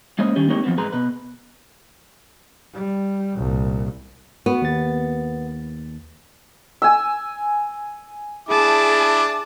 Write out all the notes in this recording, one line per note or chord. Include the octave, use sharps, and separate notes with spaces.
G#3 A#3 C#4 C5 C#5 D#5
D#3 G3 C#4 G4
G#3 A#3 C4 D#4 G4 C#5
F3 F#3 B3 C4
G#2 G#4 B4 A#5 C6
B2 B4
G3
C2 A#2
B3 F#4
D#2 A6
G#5 E6
D4 E4 G#4 A5 D6